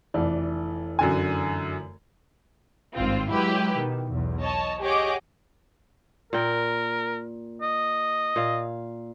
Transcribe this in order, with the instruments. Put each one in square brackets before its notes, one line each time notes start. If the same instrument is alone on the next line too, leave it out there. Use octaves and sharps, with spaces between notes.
[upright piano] F1 E3 D5
[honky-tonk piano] F#2 D3 G#5
[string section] G#1 G2 C4 F4
F#3 G#3 E4 G4 B4
B2 D#3
B1 E2
C#5 D#5 A5
G4 G#4 C#5 D#5 F#5 D6
[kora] A#2 G5 [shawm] A#4
[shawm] D#5
[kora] A#2 F5